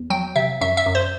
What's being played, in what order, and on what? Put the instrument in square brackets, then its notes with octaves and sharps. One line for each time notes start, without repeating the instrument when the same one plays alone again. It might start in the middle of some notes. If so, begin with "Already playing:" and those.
Already playing: [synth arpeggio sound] E2
F#3 G5
C3 E5
F#2 E5
E5
F#2
C5